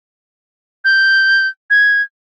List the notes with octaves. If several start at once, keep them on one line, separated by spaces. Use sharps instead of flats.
G6
G#6